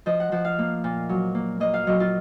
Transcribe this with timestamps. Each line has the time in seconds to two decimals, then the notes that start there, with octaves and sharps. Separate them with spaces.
0.06 F3 D#5
0.20 F#5
0.32 F3 F#5
0.45 F5
0.58 A#3
0.84 A#2
1.09 F#3
1.35 A#3
1.60 A#3 D#5
1.74 F5
1.87 F#3 D#5
2.00 F4